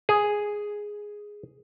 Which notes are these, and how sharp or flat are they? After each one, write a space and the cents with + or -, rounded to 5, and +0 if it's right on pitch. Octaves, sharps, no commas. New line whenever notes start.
G#4 +0